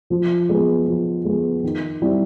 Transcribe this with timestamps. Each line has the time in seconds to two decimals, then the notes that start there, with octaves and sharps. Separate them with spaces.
0.10 F3
0.49 G#3 B3
0.87 F3
1.25 G#3 B3
1.64 D#3
2.02 G3 C4 E4